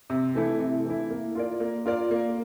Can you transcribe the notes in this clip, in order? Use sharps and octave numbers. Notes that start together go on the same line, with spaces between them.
C3
E3 A3 E4
C3
E3 A3 E4
A#3
F4 A#4 D5
A#3
F4 A#4 D5
A#3